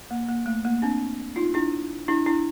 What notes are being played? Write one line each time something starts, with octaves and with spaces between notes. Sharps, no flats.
A#3
A#3
A3
A#3
C4 D4
D#4 F4
D4 E4
D4 E4
D4 E4